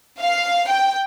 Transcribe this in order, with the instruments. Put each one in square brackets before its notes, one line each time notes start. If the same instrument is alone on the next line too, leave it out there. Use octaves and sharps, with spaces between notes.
[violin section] F5
G5